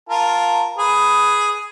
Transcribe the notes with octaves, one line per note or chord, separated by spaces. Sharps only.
F4 A#4 A5
G#4 B4